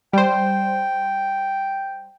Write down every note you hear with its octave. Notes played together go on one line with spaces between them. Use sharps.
G3 C5 G5